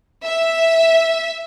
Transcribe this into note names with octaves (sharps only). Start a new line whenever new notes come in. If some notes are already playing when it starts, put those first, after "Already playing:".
E5